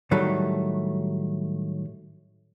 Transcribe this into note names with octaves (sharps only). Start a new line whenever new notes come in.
A2 D#3 F#3 G3 A3